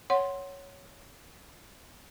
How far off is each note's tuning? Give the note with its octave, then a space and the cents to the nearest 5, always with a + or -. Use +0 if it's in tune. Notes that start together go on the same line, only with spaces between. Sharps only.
C#5 +5 F#5 +10 C6 +5